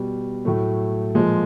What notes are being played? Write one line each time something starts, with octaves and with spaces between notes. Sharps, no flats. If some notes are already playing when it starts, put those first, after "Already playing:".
Already playing: B2 G3
A2 F#3 A3
A#2 F3 G#3